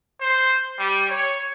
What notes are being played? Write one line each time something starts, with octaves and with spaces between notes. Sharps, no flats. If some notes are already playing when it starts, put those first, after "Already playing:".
C5
G3
C#5